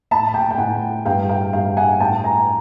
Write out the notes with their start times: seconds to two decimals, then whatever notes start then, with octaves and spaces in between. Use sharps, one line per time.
0.11 A2 A5 B5
0.34 G5 A5
0.51 G5
0.58 A2 F#5 G#5
1.05 G2 F5 G5
1.29 F5 G5
1.53 G2 F5 G5
1.77 F#5 G#5
2.00 A2 G5 A5
2.24 G#5 A#5